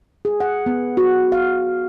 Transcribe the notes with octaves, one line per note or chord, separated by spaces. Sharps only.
G#4
F#5
B3
F#4
F5